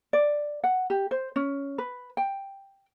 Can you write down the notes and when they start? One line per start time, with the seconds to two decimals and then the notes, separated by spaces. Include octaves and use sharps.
0.13 D5
0.64 F#5
0.90 G4
1.11 C5
1.36 C#4
1.78 B4
2.17 G5